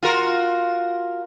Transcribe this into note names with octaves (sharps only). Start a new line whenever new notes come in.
F4 F#4 A#4